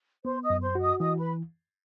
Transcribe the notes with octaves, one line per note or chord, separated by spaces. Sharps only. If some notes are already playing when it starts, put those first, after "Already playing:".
B3 C5 C6
D#5 D#6
F#2
C5 C6
F#4
D#5 D#6
E3 D#5 D#6
B4 B5